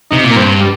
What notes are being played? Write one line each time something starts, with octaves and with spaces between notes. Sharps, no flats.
C3 D#4
A#2
A#3
G2 C4
G3